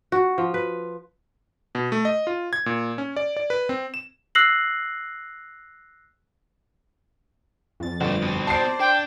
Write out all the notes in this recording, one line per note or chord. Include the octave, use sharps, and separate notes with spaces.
F#4
F3
B4
B2
A3
D#5
F4
G#6
A#2
C#4
D5
D5
B4
C4
E7
E6 F#6 A#6 C7 F#7
F2 A6
G1 A3 C4
B2 C4
C5 D5 A5 C7
D4 G5